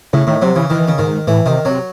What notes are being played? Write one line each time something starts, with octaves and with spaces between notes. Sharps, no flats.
A2 C#3
A2 D#3
C3 F#3
C#3 E3
D#3 E3
C#3
G#2 D#3
A2 E3
C3 D#3
C3 F#3